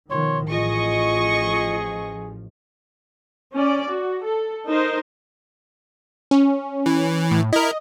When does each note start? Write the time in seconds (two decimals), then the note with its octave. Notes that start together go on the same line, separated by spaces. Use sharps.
0.10 B2 D#3 F3 C#5 C6
0.50 A1 F3 F4 G#4 D#5 C#6
3.53 C#4 D5
3.88 F#4
4.21 A4
4.68 D#4 A#4 C5
6.31 C#4
6.86 E3
7.31 A2
7.53 E4 A#4 D#5